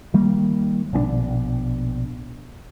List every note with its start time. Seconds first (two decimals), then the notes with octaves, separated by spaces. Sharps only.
0.14 D#3 G3 A#3
0.93 A#1 B2 C4 D4